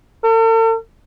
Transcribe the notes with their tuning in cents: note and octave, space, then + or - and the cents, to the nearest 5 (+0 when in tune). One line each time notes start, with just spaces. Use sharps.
A4 +45